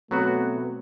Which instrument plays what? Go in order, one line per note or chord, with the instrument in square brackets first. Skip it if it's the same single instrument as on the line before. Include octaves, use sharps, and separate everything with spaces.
[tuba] B2 [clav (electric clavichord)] F#3 B3 F#4 [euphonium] A3 [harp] C4